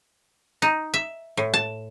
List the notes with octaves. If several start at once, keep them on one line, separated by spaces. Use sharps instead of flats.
D#4
E5
A2
A5